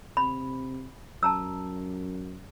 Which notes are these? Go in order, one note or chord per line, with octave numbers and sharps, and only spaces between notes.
C3 B5
F#2 A5 A#5 E6